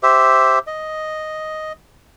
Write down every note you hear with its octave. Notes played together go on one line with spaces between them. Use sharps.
G4 C5 E5
D#5